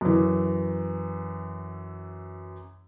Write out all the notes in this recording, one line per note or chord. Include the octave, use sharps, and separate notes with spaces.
F#2 E3